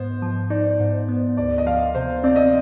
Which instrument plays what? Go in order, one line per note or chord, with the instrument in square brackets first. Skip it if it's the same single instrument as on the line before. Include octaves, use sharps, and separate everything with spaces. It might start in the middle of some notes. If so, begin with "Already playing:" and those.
Already playing: [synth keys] G#2 B3 [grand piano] C5
[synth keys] F3
[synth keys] D#4 [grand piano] D5
[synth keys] G#2
B3
[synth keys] D2 [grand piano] D5
[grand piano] D#5
[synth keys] F3 [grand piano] F5
[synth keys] C3 [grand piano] C5
[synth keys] C4 [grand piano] D5
[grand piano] D#5